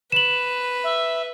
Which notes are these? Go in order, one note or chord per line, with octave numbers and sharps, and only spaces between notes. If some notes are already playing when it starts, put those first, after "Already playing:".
B4 E7 F#7
E5